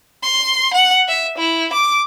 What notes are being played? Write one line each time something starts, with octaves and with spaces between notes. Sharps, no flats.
C6
F#5
E5
E4
D6